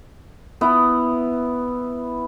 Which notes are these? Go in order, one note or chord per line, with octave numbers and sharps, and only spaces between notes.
B3 E4